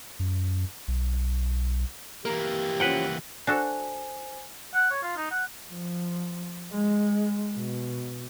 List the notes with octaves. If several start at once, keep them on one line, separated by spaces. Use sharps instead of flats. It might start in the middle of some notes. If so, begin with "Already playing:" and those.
F#2
B1
E3 A#3 G4 A#4
F3 C#4 B4 F#5 G5
D4 F#4 A4 C5 G#5
F#5
C#5
F4
D#4
F#5
F3
G#3
B2